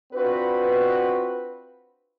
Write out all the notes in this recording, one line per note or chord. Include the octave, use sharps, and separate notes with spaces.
C4 D4 F4 F#4 B4